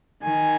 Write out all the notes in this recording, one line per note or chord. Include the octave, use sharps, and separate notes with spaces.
D#3 G#5